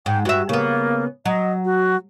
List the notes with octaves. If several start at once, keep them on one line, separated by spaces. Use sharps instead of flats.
G#2 G5
G2 F#4 E5
C#3 A#3 B3
F#3 D#5
F#4